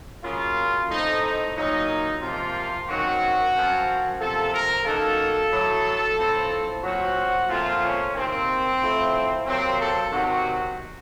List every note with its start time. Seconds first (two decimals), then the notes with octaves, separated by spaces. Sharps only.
0.22 C#3 F#3 A#3 F4
0.89 A2 A3 C4 D#4
1.22 D#4
1.54 A#2 F#3 A#3 D#4
2.20 C3 F3 A#3 F4
2.87 F#2 D#3 F#3 C4 F#4
3.53 F#2 F3 C4
4.19 C3 F3 A#3 A4
4.52 A#4
4.84 F#2 D#3 A#3 A4
5.50 A2 F#3 A3
6.16 A2 F3 C4
6.83 A#2 F#3 C4 F#4
7.47 A#2 F3 A3 C4 F4
7.82 C#4
8.13 C3 D#3 A#3 C4
8.80 A2 F3 A3
9.46 C3 F#3 A#3 C4
9.78 A4
10.11 C3 D#3 F#3 F#4